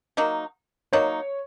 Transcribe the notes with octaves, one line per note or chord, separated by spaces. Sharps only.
F#3 A#3 D#4
F#3 A#3 D#4 C#5